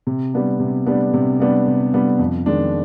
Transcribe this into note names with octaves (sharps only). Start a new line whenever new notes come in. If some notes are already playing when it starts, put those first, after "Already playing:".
C3
G3 B3 D4
C3
G3 B3 D4
C3
G3 B3 D4
C3
G3 B3 D4
F2
D#3 G#3 D4